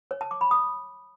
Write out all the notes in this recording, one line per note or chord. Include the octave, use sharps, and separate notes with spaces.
C#5
A5
D6
B5
D#6